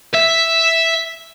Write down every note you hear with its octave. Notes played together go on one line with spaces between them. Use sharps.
E5